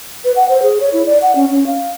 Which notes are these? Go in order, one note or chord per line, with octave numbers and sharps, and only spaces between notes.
B4
F#5
C5
G#4
C#5
E4
D5
F#5
C#4
C#4
F5